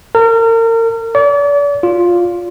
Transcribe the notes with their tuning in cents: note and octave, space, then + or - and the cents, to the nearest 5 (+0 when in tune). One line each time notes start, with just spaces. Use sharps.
A#4 -35
D5 -40
F4 +5